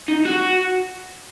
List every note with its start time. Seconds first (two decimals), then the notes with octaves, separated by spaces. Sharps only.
0.08 D#4
0.25 F#4